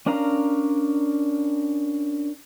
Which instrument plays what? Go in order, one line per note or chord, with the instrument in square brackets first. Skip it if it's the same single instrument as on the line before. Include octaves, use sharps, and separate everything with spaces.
[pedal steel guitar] C#4 D4 A#4 F5 A#5